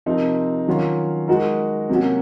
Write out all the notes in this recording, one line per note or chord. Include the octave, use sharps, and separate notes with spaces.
C3 F3 C4 D#4 A#4
D#3 F#3 C#4 F4
G#3 D#4 F#4 A#4
C3 F#3 A#3 C#4 F#4